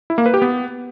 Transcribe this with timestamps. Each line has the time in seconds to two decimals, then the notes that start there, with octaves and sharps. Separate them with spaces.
0.10 E4
0.18 A#3
0.26 B4
0.34 G4
0.42 B3